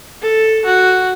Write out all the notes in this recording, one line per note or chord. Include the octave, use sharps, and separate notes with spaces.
A4
F#4